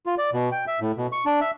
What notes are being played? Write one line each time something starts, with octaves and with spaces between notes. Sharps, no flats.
F4
D5
B2
G5
E5
A2
B2
C#6
D4
E5